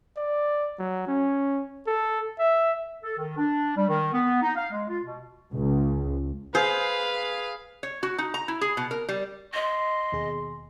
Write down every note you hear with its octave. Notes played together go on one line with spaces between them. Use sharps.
D5
F#3
C#4
A4
E5
A4
D#3
D4
G3
D#3
B3
D#4
F5
G#3
F4
B2
C#2
G#4 B4 C5 F5
C#5
F#4
D#4
A#5
E4
G#4
B2
A#4
G3
D#5 C6
D#2 B2 G#4